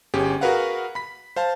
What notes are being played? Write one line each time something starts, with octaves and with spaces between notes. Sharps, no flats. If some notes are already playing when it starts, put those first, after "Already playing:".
G1 C#4 G4 G#4
F#4 G#4 A#4 B4 F5 F#5
B5 B6
C5 F5 A5